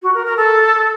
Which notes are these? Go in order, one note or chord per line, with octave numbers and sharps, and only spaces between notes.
F#4
A#4
A#4
A4